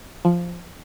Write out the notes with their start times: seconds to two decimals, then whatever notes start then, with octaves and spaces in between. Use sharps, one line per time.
0.25 F3